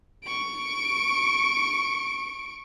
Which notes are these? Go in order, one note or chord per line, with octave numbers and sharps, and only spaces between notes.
C#6 D7